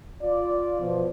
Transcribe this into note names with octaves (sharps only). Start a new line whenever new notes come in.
F4 D5
B2 F3